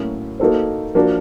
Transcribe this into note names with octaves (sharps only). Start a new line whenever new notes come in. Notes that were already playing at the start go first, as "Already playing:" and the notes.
Already playing: A2 F#3 A#3 C#4 F#4
A#3 D#4 F#4 A4 C5
F3 A#3 D4 F#4